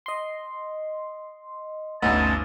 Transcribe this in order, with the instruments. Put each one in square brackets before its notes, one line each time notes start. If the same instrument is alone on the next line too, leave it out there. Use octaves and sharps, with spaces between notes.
[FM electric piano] D#5 C6
[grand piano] G1 D2 [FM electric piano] C#4 D#4 B4 [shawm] A5